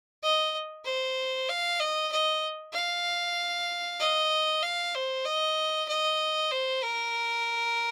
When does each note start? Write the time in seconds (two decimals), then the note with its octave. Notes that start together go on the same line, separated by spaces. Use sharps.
0.23 D#5
0.85 C5
1.49 F5
1.80 D#5
2.12 D#5
2.74 F5
4.00 D#5
4.63 F5
4.95 C5
5.26 D#5
5.88 D#5
6.51 C5
6.83 A#4